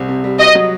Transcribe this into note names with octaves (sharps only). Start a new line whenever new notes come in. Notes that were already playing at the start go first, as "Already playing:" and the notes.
Already playing: C2 G3 C4
C3
G3
F#4 D#5
F#3